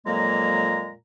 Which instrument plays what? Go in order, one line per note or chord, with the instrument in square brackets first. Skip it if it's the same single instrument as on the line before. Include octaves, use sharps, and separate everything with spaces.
[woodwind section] F2 A#2 F#3 G#3 A#3 A#5